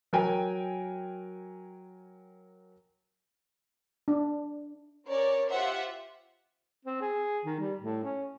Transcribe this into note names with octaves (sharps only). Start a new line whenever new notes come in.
F#3 A#4 G5 G#5
D4
C#4 A#4 C#5 D5
F4 G4 C5 E5 F#5
C4
G#4
D#3
G3
A2
C#4